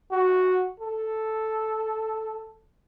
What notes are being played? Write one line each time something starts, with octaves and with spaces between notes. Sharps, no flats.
F#4
A4